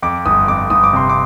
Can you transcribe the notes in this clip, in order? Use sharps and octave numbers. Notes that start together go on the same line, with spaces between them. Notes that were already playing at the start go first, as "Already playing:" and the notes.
F2 D6
G1 D#6
F2 D6
G1 D#6
D6
C3 C6
D6